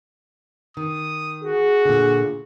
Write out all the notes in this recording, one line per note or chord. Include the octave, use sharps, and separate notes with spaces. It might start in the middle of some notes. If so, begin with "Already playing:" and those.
D#3 D#6
F#4 G#4
A#2 D3